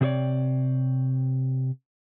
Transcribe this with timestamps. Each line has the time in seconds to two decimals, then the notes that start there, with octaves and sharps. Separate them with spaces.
0.01 C3 C4 G#4 C#5 D5